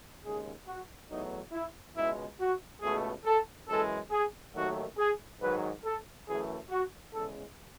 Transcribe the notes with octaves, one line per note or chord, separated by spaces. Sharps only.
D#2 C#3 G#3 G#4
F#4
E2 B2 F#3 A3 D#4
E4
C#2 B2 G#3 E4
F#4
C#2 B2 A3 G#4
A4
F#2 E3 G#3 A4
G#4
D#2 D#3 F#3 A3 F#4
G#4
G#2 D#3 F#3 B4
A4
F#2 E3 A3 G#4
F#4
E2 C#3 G#3 A4